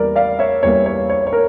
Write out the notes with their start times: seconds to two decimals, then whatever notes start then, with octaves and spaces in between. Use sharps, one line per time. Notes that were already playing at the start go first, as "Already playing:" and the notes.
Already playing: E2 E3 G3 A#3 A#4 D5
0.16 D5 F5
0.39 C#5 E5
0.63 E2 E3 G3 A#3 C#5
0.86 C#5
1.10 C#5
1.27 C#5
1.33 A#4